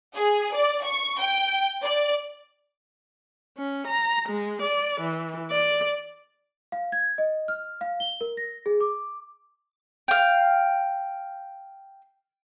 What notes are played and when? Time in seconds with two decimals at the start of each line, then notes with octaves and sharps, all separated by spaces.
0.16 G#4
0.54 D5
0.85 C#6
1.20 G5
1.83 D5
3.58 C#4
3.87 A#5
4.29 G#3
4.62 D5
5.01 E3
5.51 D5
6.72 F5
6.92 G#6
7.18 D#5
7.48 F6
7.81 F5
8.00 G7
8.21 A#4
8.37 A#6
8.66 G#4
8.80 D6
10.08 F5 G5